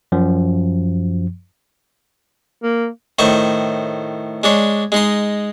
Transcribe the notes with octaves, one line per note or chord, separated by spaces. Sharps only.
F#2 F3
A#3
A2 D#3 C5 C#6
G#3 D4 C#5
G#3 D#4 C6